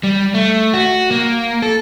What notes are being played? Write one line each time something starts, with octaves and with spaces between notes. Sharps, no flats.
G3
A3
F#4
A#3
A4